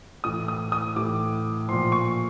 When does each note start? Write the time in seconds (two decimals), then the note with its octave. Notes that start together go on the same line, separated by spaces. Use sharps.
0.24 A2 E3 D#6
0.48 D#6
0.72 D#6
0.96 A2 E3 D6
1.68 A#2 F3 C6
1.92 C#6